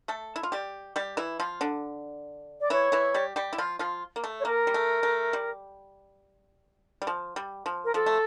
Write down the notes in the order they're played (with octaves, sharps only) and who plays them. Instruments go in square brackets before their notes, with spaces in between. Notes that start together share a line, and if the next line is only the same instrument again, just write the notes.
[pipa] A3 A4
E4
F4
G3 G4
G3 G4
E3 E4
F3 F4
D3 D4
[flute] D5
[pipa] E3 E4 [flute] C#5
[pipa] E3 E4
G3 G4
G3 G4
E4
F3 F4
F3 F4
A#3
A3
[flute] C#5
[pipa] A#3 [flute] A#4
[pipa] G3
A3
A3
G3
G3
F3
G3
F3
[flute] A#4
[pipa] F3 [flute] A4
[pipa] A3